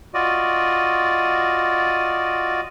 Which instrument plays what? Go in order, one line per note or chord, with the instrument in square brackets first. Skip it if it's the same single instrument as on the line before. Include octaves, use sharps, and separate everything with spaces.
[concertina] F4 F#4 D5 D#5